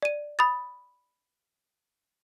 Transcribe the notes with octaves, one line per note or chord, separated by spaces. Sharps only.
D5 D#7
B5 D#6 A6